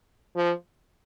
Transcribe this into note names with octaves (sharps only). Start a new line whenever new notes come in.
F3